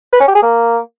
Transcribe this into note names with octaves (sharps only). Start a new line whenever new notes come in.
B4
C#4
G4
G#4
A#3